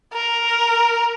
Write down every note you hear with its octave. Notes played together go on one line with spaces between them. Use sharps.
A#4